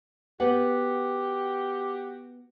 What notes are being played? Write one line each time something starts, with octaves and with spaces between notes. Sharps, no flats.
B3 F#4 G4 B4 F#5